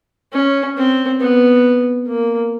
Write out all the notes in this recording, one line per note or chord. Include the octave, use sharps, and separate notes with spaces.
C#4
C4
B3
A#3